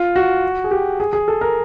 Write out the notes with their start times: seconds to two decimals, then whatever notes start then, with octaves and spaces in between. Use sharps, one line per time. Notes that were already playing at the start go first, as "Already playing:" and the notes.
Already playing: F4
0.16 F#4
0.64 G#4
0.71 G4
1.00 G#4
1.13 G#4
1.28 A4
1.41 A#4